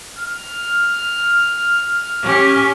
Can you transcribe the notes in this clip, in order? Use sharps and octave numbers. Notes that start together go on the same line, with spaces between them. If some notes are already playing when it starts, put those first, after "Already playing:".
F6
C#4 G4